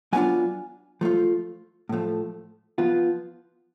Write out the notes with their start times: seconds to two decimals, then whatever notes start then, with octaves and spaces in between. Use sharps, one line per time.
0.13 F#3 B3 D4 F4 G#5
1.01 F3 A3 F4
1.89 A2 F3 A3
2.78 F3 B3 F4